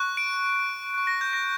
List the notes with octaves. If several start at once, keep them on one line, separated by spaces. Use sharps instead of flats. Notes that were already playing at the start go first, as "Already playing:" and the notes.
Already playing: C#6 F#6
D7
C#6 F#6
A#6
G6
A#6